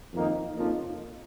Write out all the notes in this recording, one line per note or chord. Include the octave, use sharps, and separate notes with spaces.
F2 D#3 A#3 D#4
F2 C#3 F3 A#3 D#4